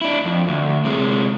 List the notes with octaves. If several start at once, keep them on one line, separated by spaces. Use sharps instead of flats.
D4 E4
F2
D2
C3 G#3